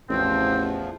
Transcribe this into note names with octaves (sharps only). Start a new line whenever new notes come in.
A1 E2 F3 C4